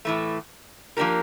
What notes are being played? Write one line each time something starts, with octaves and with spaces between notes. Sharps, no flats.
A2 E3 A3
F3 A#3 D4 G4 A#4